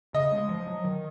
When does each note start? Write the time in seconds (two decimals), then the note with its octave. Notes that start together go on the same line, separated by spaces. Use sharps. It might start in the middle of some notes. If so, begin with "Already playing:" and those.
0.14 C#3 D#5
0.32 G#3
0.49 F3
0.67 F#3
0.85 D#3